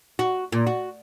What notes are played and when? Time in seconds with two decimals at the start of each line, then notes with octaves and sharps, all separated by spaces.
0.19 F#4
0.52 A#2
0.67 F#4